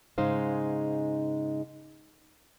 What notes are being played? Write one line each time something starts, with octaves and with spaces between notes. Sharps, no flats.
G#2 C#3 G#3 D#4 C5 F5